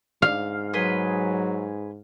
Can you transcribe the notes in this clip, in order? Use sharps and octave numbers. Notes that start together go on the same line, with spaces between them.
G#2 F5
F#3 G#4 B4 C6